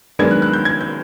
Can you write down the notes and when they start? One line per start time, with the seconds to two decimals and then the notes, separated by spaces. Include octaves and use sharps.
0.19 F#2 D#3 G#3 B3 D4 G#6
0.31 F#6
0.42 F#6
0.53 G6
0.65 G#6
0.81 G6